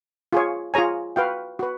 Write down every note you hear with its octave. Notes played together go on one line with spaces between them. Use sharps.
F4 G#4 C#5
F4 G#4 C#5 G#5 A#5
F#4 B4 F5 G5
F#4 B4